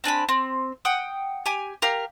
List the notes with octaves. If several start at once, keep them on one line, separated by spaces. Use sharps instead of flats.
C4 D4 G#5 B5
C4
F#5 G5 D#6
G4 G#5
G4 A#4 F5